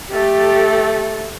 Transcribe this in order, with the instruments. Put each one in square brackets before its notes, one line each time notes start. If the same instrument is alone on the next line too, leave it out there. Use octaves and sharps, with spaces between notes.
[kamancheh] A3 A4 [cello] G4